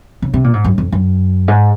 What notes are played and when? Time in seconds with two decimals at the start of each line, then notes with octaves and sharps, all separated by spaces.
0.22 C#3
0.34 C3
0.44 A#2
0.53 G#2
0.64 F#2
0.78 F2
0.92 F#2
1.48 G#2